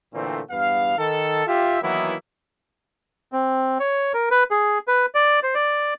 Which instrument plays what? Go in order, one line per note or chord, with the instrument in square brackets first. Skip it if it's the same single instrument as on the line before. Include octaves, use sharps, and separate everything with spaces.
[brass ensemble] A#2 D3 E3 A3 C4
E2 G2 B3 F5
D#3 A4
F4 G4 E5
D#3 E3 F#3 A#3 B3 E4
[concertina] C4
C#5
A#4
B4
G#4
B4
D5
C5
D5